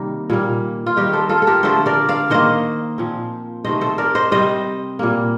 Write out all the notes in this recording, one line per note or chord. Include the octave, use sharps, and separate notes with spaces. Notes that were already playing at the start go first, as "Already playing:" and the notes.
Already playing: C3 D#3 G3 A#3 D#4
A#2 G3 A#3
F4
D#3 G3 C4 D#4 G4
A4 C5
F4 A4
A4
G4 A#4
D3 F3 A3 A4 C5
A#4 D5
D5 F5
D#3 A#3 C5 D#5
A#2 F3 C4
C3 D#3 A3 C4 C5 D#5
A4 C5
A#4 D5
C5 D#5
C3 G3 C4 C5 D#5
A#2 G3 A#3